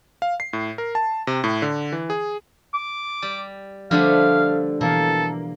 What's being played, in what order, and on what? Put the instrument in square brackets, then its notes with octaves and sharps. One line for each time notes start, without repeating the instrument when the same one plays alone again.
[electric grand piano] F5
C7
A2
A#4
A5
C3
A2
D3
E3
G#4
[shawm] D6
[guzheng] G3
[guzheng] D3 G3 A3 [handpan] F3 D4 [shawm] F5
[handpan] B2 E3 F5 [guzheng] A#3 [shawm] A4